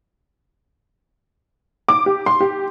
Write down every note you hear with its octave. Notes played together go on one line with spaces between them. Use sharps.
D6
G4
C6
G4